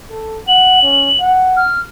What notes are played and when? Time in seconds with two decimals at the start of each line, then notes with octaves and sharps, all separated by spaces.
0.10 A4
0.48 F#5 F#7
0.82 C#4
1.21 F#5
1.57 F6